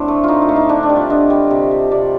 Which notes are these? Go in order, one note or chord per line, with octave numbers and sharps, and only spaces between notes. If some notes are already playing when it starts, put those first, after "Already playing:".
Already playing: A2 C4 D4
A3
A2 D#4 F4
F4
A3
D#4
D3 D4
D4
G3
F4
D3 D#5
G3
C3
G3
C3 D5